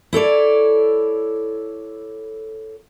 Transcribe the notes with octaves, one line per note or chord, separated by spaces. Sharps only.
E4 A4 C#5 D5